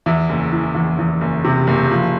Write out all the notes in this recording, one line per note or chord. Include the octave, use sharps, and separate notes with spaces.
E2 E4
F#1
E3
E2
E2
F#1
C3
F#1
F3